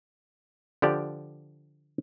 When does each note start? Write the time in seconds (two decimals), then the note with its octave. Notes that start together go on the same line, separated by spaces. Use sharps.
0.82 D3 F3 G4 D5